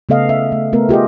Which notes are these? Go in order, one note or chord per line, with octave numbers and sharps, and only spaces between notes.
C#3 A3 B3 A4 D#5 F5
E5
A3
A3 B3 A#4
F4 G4 G#4 D#5